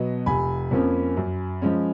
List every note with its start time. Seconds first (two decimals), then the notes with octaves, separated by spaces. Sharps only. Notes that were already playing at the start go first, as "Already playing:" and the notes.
Already playing: B2 F#3 B3 D#5
0.26 F1 G#5 B5
0.71 F2 F3 A#3 C#4
1.17 F#2
1.62 F3 G#3 C#4